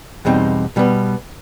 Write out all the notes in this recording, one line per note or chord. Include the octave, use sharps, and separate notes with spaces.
E2 B2 G3 C4 D#4
B2 G3 B3